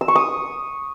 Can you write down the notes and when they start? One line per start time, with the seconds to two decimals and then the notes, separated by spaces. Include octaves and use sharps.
0.01 E6
0.08 C#6
0.15 D#6